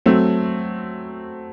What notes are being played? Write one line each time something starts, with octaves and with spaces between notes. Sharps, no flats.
F#3 A3 C4